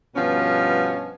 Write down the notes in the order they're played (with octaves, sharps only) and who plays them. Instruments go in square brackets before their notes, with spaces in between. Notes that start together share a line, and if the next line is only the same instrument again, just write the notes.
[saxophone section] G2 B2 F3 B3 C#4